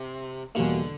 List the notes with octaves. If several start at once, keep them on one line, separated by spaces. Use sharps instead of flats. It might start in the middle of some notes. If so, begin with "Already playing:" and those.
Already playing: C3
E2 B2 D3 G3 A#3